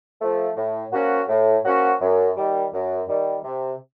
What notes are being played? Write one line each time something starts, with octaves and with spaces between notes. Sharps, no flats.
F3 A3
A2
F3 A#3 C#4 F#4
A2
F3 A#3 C#4 F#4
F#2
D#3 G3
F#2
D#3 G3
C3